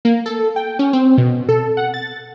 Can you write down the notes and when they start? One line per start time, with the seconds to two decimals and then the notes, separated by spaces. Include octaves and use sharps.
0.05 A#3
0.26 A4
0.56 G5
0.79 C#4
0.93 C4
1.18 B2
1.49 A4
1.77 F#5
1.94 A6